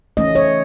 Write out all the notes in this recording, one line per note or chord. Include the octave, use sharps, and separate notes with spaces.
E3 A3 C#4 D#5
C#5